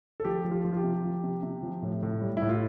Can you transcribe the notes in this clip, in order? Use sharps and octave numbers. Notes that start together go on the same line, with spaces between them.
A4
F3 G4
F3
F4
F3
F4
G4
C3
F3
C3
C3
F3
A2
A2
G3
E4
A2
F4